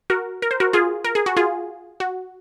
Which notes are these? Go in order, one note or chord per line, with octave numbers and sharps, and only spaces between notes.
F#4 A#4
A#4
C5
F#4 A#4
F4 G#4
A#4
G#4
F#4
F4 G#4
F#4